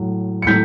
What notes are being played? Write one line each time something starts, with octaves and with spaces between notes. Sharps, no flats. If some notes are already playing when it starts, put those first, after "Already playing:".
Already playing: A2 F#3
C#7
A2 F#3 G6 B6